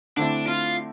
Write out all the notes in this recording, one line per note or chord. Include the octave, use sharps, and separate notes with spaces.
D3 A3 C4 D4 E4
F4